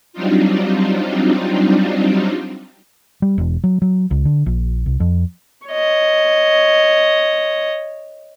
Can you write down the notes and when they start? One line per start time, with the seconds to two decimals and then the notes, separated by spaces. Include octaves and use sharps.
0.13 F#3 G3 C4 D4 D#4 F4
3.22 G3
3.38 E1
3.64 F#3
3.82 F#3
4.11 C#2
4.25 D3
4.46 A#1
4.86 C2
5.00 F2
5.67 C#5 D#5